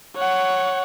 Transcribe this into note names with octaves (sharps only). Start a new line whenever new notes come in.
C#5 F#5